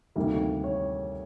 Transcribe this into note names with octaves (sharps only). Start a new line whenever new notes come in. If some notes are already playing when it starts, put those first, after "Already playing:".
D2 C3 D#3 G3 A#3
C#5